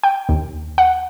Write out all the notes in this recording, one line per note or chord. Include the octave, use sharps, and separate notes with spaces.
G5
D#2
F#5